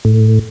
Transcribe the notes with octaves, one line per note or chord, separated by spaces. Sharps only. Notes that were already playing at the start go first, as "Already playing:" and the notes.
A2